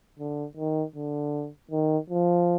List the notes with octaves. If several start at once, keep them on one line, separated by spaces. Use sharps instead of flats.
D3
D#3
D3
D#3
F3